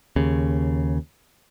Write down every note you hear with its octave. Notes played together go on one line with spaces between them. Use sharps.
D#2 C#3